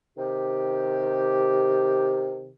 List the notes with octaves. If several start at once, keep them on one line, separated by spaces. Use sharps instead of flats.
C3 D#3 G4